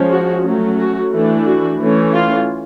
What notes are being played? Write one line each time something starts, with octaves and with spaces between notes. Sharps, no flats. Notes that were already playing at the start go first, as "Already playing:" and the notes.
Already playing: F3 G#3 C#4
F#4
F#3 A3 C#4
F#4
E3 A3 D4
F#4
E3 A3 C#4
F4